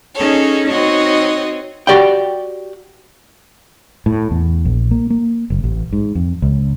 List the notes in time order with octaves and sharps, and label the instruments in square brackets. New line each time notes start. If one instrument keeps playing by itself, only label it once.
[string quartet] C#4 D#4 G#4 A4 C#5
C4 D#4 F#4 C#5 D#5
[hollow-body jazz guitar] F#4 G4 D5 F#5 G5
[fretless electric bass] A2
E2
A#1
A#3
A#3
F#1
A1
G#2
F2
C#2